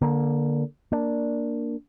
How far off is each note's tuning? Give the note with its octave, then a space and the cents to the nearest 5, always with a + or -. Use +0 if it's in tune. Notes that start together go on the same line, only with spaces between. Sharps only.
D3 +0 A#3 +20
A#3 +0 D4 +0